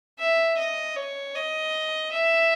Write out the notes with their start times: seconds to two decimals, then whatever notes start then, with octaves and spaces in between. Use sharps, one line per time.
0.19 E5
0.57 D#5
0.96 C#5
1.35 D#5
2.12 E5